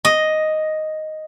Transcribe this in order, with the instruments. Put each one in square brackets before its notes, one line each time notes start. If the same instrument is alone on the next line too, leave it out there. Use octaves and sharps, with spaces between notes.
[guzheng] D#5